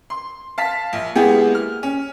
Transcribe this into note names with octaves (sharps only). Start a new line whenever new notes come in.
C6
F5 A5 B6
A#1
G#3 A#3 B3 E4 G4 G#4
F6
C#4